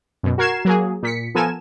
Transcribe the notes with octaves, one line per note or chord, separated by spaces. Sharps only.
F#2 B2
F#4 A#4 G#6 C7 E7
F#3 A#3 G#4
A#2 B6 C#7
F3 B3 A4 A#4 G#5 E7